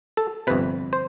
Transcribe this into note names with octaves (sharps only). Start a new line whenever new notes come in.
A4
G1 F2 C3 B4
C5